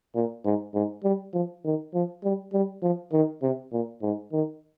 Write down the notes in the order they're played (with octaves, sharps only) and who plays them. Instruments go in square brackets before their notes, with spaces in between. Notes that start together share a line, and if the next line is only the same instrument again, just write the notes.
[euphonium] A#2
G#2
G#2
G3
F3
D#3
F3
G3
G3
F3
D#3
C3
A#2
G#2
D#3